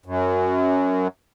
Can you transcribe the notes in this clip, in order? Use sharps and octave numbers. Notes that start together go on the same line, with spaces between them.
F#2